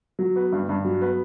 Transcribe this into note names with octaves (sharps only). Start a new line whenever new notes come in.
F#3
B3
G2
G2
F#3
B3